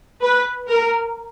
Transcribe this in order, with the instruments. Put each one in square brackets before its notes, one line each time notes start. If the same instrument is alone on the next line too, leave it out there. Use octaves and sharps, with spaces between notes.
[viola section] B4
A#4